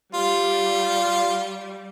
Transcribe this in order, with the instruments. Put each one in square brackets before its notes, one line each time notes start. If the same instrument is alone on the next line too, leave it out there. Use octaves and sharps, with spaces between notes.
[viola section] G3 [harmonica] F4